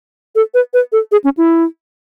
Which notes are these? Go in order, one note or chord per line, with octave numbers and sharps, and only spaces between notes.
A4
B4
B4
A4
G#4
C#4
E4